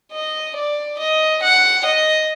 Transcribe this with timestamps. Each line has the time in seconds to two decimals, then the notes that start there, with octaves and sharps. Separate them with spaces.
0.12 D#5
0.55 D5
0.99 D#5
1.42 F#5
1.85 D#5